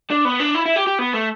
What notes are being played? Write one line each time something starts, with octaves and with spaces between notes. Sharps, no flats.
D4
B3
D4
E4
E4
G4
G4
B3
A3